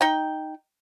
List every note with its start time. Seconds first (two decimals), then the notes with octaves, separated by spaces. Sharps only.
0.01 D#4 G5